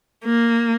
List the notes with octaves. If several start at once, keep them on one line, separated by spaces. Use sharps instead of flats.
A#3